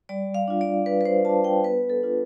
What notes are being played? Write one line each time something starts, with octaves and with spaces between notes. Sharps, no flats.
G3 D5
F5
D4 F4
D5
G3 B4
B4
C5
D4 F4 A5
G5
B3 B4
A4
D4 F4